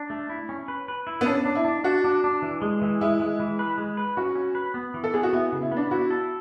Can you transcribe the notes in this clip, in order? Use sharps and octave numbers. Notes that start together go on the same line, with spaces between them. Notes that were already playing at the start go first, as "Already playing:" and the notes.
Already playing: D4
A3
E4
C#4
B4
B4
E4
B3
C#4 D4
D4
E4
D4
D4 F#4
D4
D4
E3
G#3
E3
G#3 E4
G#3
E3
B4
G#3
B4
C#4 F#4
C#4
B4
B3
E3
A4
B3 G#4
F#4
B3 E4
C#3
E4
B3
D4
E4 F#4
A4